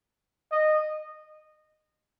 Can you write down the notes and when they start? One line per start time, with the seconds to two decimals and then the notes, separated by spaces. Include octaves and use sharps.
0.51 D#5